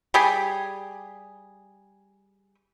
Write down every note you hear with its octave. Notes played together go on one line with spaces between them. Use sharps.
G3 G4 G#4